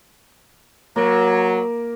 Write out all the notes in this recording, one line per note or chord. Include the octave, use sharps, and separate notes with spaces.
F#3 A#3